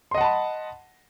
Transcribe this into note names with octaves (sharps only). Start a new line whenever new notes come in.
D#5 F#5 A5 B5 C6